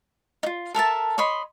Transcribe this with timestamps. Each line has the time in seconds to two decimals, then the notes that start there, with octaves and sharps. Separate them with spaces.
0.43 D#4 F4
0.75 A4 A#4 E5 A5
1.18 C#5 D#5 B5 C6